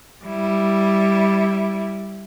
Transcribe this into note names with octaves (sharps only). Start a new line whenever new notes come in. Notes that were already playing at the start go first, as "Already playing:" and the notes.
G3 E4